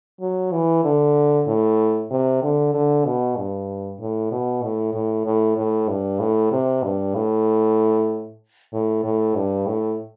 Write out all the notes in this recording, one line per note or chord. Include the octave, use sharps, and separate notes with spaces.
F#3
E3
D3
A2
C3
D3
D3
B2
G2
A2
B2
A2
A2
A2
A2
G2
A2
C3
G2
A2
A2
A2
G2
A2